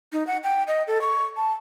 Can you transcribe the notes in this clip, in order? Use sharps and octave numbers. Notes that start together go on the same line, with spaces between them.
D#4
F#5
G5
D#5
A4
C#6
A5